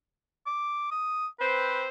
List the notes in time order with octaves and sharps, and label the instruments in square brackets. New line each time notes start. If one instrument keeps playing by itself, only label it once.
[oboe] D6
D#6
[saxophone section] C4 C5 [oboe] B4